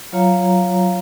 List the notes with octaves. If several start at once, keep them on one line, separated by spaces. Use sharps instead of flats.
F#3 F4 C#5 F5 A#5